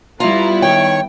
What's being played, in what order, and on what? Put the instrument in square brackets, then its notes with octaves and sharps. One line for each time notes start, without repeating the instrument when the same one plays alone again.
[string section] G3 B3 E4 [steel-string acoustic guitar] F4 [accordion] A#5
[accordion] D#3 C#5 C#6 [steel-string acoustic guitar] G5